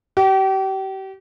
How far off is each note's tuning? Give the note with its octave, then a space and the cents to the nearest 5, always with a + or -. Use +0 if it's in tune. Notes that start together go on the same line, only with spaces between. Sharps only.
G4 -35